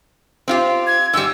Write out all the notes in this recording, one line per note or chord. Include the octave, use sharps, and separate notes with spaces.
C4 F4 G4
G#6
G#2 G3 E6